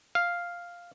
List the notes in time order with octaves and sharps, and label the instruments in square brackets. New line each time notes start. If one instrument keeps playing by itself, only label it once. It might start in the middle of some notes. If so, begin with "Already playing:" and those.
[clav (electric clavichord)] F5